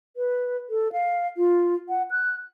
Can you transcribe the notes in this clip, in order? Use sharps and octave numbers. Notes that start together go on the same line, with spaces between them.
B4
A4
F5
F4
F#5
F#6